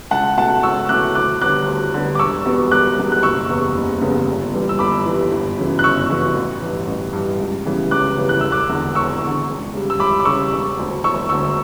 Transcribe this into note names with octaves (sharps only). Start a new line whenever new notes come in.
C#2 F#5 A5
B2 A3 F#5 A5
C#2 C#6 E6
B2 A3 D6 F#6
D2 D6 F#6
D3 G3 B3 D6 F#6
D2
D3 G3 B3
D6
E1 C#6 E6
E2 B2 G3 B3
E1 D6 F#6
E2 B2 G3 B3
F#6
F#1 C#6 E6
E2 C#3 G3 B3
F#1
E2 C#3 G3 B3
G1
G2 E3 G3
E6
G1 B5 D6
G2 E3 G3
G1
F#2 C#3 E3
F#6
G1 C#6 E6
F#2 C#3 E3
A1
G2 E3
A1
G2 E3
C#2
C#3 E3 G3 B3
C#2 D6 F#6
C#3 E3 G3 B3
F#6
E1 E6
D6 F#6
E2 D3
E1 C#6 E6
E2 D3
C#2
C#3 G3
E6
C#2 B5 D6
D6
C#3 G3 C#6 E6
E1
D2 D3
E1 C#6 E6
D2 D3 C#6 E6